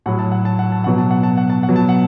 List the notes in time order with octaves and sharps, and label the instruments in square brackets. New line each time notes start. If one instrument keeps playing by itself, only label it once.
[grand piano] A2 F#3 F#5
A5
F#5
A5
F#5
A5
B2 F#3 F#5
A5
F#5
A5
F#5
A5
F#5
B2 F#3
A5
F#5